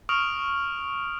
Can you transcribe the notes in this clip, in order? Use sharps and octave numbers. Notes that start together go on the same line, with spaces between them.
C#6 D#6 F6 D7 F7 F#7